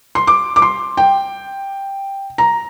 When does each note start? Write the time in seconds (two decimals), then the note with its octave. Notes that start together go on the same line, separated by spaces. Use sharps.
0.15 C6
0.27 D6
0.56 D6
0.62 C6
0.97 G5
2.38 A#5